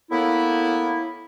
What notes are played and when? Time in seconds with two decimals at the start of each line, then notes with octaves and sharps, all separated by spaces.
0.10 A2 A#3 B3 E4